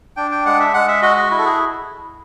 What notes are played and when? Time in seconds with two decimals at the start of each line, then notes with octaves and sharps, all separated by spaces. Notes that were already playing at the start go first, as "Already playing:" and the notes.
0.17 D4 G5
0.31 G5
0.46 G#3 F#5
0.60 E5
0.74 G#3 F#5
0.88 E5
1.02 F#4 D#5
1.16 D#5
1.31 E4
1.38 A4
1.45 G#4